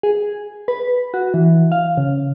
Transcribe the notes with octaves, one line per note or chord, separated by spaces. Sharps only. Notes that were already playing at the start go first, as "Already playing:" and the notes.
G#4
B4
F#4
E3
F5
C#3